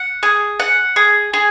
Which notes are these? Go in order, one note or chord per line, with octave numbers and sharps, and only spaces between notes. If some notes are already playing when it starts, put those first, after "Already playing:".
Already playing: F#5
G#4
F#5
G#4
G#4